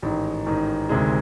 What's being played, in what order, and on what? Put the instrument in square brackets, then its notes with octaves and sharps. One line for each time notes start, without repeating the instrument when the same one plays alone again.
[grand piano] A1 G#2 D#3
A1 G#2 D#3
D2 C3 D#3 G#3